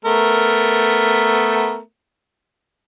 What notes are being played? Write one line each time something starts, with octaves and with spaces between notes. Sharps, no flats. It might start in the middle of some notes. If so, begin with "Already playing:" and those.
A3 B3 A#4